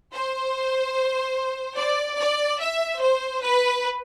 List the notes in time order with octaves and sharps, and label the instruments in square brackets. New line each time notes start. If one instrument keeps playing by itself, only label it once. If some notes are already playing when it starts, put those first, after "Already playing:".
[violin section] C5
D5
D5
E5
C5
B4